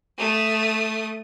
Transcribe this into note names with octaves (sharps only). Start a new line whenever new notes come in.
A3 D#6